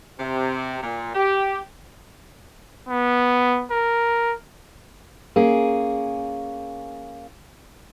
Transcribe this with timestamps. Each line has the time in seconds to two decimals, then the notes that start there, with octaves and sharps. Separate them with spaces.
0.19 C3
0.83 A#2
1.14 G4
2.89 B3
3.71 A#4
5.36 A#3 C#4 G#4